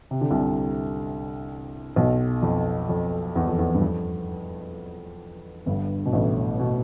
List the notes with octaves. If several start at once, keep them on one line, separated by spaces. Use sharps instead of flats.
C3
D3
C2 C3
B1 B2
F2
F2
E2
F2
E2
G2
F2
G1 G2
B2
A1 A2
B2